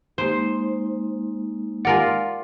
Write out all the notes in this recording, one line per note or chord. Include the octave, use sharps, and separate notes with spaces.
G#3 A#3 D#4 C5
F4 A#4 D5 F#5 G#5